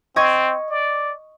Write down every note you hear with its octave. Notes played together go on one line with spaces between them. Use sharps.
C4 D#5 C#6 G#6
D5